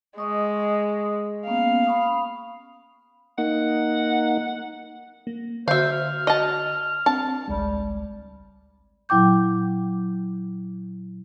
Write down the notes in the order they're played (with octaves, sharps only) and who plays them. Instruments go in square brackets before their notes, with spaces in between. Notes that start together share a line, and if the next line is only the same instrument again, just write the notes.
[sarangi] G#3 [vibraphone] D#5 C#6 D#6
[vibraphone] A#3 B3 C#4 [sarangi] F5
[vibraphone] B5 C#6 D#6
[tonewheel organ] A#3 D#4 [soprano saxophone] F#5
[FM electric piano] A#3
[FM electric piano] D3 F#4 [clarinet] C5 [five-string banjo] E5 F5
[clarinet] F6
[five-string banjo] D#5 A5
[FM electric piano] C4 D4 [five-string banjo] A5
[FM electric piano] G#1 C#2 G#3 [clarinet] G3
[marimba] A#2 F#3 E4 G5 D6 G6